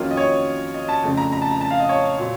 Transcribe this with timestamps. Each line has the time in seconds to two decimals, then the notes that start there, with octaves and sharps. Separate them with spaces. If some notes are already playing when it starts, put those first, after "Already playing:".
Already playing: F2 D#3 F#3 A#3 C#4 F4
0.11 D#5
0.17 C#5
0.74 D#5
0.88 A5
1.03 F2 C#3 A3
1.17 A#5
1.32 A#5
1.42 A5
1.51 A#5
1.61 A5
1.71 F5
1.80 D#5
1.89 C#5
2.17 A#2 F#3 C4